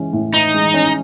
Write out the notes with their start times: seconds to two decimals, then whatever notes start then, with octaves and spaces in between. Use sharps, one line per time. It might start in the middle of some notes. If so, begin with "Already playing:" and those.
Already playing: E3 G#3 C#4
0.13 A2
0.34 E3 D#4
0.54 G#3
0.74 C#4